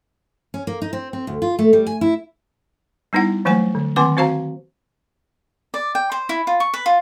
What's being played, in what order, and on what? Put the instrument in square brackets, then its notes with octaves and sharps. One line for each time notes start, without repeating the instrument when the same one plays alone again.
[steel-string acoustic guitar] C#4
A#3
D#4
C4
C4
D2
F4
A3
G3
G#5
E4
[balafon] G3 B3 D#4 E4 F#5
E3 F#3 A3 A#3 G#5 C#6
D3
D#3 A#3 C4 G#5 C6 D6
C4 F#4 C5 F5 A5 A#5
[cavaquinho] D5
G5
C5
E4
F4
C#6
B4
F4